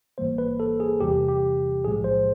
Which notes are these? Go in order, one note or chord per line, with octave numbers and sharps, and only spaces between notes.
A1 G#2 E3 G3 A#3 C5
B4
A4
G#4
E2 C3 E3 G3 G4
G4
B1 A2 F3 G#3 G#4
C5